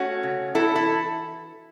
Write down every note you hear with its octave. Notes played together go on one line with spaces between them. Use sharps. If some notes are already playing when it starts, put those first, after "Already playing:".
Already playing: A3 C#4 F#4
C#3
E3 E4 A4
E4 A4